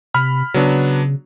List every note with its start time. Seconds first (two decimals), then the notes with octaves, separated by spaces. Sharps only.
0.14 C3 B5 F6
0.54 C#3 F#3 B3 D4